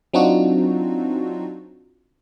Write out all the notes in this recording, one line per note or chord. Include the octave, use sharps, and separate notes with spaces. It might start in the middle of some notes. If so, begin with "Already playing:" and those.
F#3 C4 D4 D#4 F4 F#4